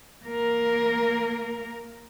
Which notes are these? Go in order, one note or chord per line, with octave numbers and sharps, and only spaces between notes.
A#3 A#4